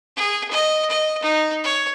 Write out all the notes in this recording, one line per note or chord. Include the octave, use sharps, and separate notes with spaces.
G#4
D#5
D#5
D#4
C#5